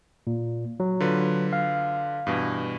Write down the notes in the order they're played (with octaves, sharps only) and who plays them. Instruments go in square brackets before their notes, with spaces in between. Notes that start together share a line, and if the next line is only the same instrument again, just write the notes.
[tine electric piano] A#2
F#3
[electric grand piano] D3 F4 B4
[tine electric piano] F5
[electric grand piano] G2 B2 E3